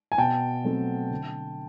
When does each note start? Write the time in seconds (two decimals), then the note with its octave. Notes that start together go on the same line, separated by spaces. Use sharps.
0.12 G#5
0.18 B2 G5 A5
0.64 F#3 A3 C4
1.11 D3